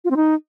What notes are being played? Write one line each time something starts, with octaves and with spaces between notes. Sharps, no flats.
F4
C4
D#4